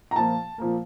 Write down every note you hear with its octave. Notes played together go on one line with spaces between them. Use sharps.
A#5
A#2 F3 A#3 A5
A#2 F3 A#3